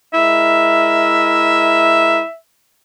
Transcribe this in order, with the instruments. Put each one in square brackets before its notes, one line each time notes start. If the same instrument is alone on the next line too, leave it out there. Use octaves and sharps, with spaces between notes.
[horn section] G#3 E4 A#4 [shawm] E5